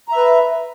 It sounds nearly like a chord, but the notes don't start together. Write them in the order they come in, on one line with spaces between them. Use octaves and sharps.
A#5 E5 B4